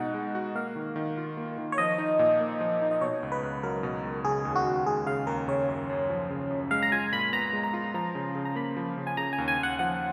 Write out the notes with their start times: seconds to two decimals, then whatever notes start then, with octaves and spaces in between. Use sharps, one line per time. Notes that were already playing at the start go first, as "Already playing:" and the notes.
Already playing: B2 G#3 D#4 F#4 F#5
0.14 G#3
0.35 F#4
0.55 A#3 F5
0.76 D#3
0.96 D#3
1.17 F4
1.37 A#3
1.58 D#3
1.72 C#5
1.78 F3 D#5
1.98 D#4
2.19 A#2
2.40 A#3
2.61 F3
2.82 D#4
2.91 D#5
3.01 B2 C#5
3.23 C#2
3.32 B4
3.43 C#2
3.63 F#3 A#4
3.83 B2
4.04 C#2
4.25 C#3 G#4
4.45 D#2
4.56 F#4
4.66 D#2
4.86 G#3 G#4
5.06 C#3 F5
5.27 D#2 A#4
5.48 C#3 C#5
5.69 F#2
5.90 F#2
6.10 F3
6.31 C#3
6.51 F#2
6.71 G#3 F5
6.83 A#5
6.92 F4 G#5
7.12 A#2 B5
7.33 B3 A#5
7.53 G#3
7.63 A#5
7.73 F4
7.94 F3 A#5
8.15 C#3
8.35 C#3
8.45 A#5
8.55 A#3 B5
8.77 F3
8.98 C#3
9.07 G#5
9.17 C#3 A#5
9.33 G#5
9.38 D#2
9.48 G#5
9.59 D#2 F#5
9.79 F3 F#5